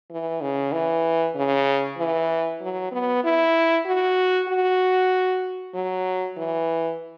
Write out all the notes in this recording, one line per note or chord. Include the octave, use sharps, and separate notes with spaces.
E3
C#3
E3
C#3
E3
F#3
B3
E4
F#4
F#4
F#3
E3